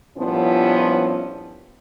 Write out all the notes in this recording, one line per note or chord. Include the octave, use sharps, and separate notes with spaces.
G2 A#2 F3 B3 C#4 E4